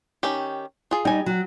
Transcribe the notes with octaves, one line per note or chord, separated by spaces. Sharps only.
D#3 C#4 G4
F4 G#4
G3 D#4 G5 G#5
F#3